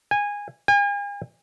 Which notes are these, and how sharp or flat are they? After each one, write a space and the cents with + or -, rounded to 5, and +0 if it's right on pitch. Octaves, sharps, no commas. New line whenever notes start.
G#5 -15
G#5 -40